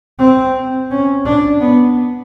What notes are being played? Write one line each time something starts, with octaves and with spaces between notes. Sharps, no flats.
C4
C#4
D4
B3